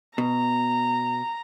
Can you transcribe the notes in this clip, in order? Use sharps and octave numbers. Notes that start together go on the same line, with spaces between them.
B2 A#5